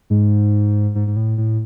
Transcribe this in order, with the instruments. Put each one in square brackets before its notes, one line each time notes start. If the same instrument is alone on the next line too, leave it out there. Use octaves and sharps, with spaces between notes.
[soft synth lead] G#2
G#2
G#2
A2
A2